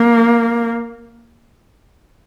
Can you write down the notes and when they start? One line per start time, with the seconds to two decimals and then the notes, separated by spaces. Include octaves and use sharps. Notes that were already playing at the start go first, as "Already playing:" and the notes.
Already playing: A#3